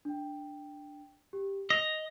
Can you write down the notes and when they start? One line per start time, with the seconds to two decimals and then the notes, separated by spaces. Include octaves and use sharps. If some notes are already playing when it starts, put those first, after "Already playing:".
0.05 D4 G5
1.33 G4
1.70 D#5 F7